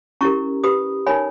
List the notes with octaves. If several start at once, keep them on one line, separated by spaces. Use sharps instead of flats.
C#4 E4 G4 A#4 A#5 C#6
G4 B4 B5 D#6
D#4 A#4 C#5 G#5 B5